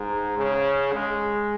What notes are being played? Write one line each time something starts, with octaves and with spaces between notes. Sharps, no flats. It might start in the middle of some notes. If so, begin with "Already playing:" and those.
Already playing: G#2
C#3
G#3